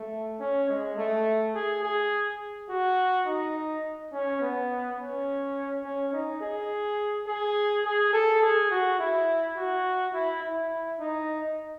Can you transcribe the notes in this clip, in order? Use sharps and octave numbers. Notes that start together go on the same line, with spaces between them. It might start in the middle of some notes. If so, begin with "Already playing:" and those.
Already playing: A3
C#4
G#3
A3
G#4
G#4
F#4
D#4
C#4
B3
C#4
C#4
D#4
G#4
G#4
G#4
A4
G#4
F#4
E4
F#4
E4
E4
D#4